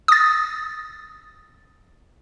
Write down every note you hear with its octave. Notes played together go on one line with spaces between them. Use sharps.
D#6 A6